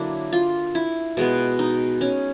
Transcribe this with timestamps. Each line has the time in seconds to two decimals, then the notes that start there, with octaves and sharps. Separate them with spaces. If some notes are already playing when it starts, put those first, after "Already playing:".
Already playing: D3 F#3 A#3 D4 E4
0.33 F4
0.75 E4
1.17 B2 G#3 B3
1.59 D#4
2.01 C#4